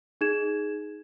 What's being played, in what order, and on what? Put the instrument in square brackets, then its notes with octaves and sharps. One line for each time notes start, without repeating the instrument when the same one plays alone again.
[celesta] D#4 G#4 G#6 E7